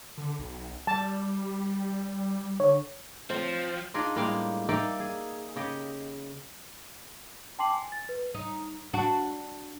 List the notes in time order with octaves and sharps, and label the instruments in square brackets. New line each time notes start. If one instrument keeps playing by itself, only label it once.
[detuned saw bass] D3
B1
[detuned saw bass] G3 [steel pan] A5
[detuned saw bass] D3 [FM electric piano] C#5
[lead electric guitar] F3 [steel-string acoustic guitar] C4
[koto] D4 D#4 F4 G#4 D5 D#5
A2 G3 G#3 A#3 F5 G5
A#3 D#4 D5 E5 F5 G5
G#4
C#3 G4 D#5
[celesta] G5 A5 C6 D6 C7 F#7
G#5
A6
B4
[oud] D#4
D4 F#4